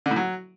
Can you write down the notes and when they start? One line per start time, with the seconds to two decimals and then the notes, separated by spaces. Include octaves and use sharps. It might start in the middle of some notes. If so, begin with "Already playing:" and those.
0.06 D3
0.11 A2
0.16 F#3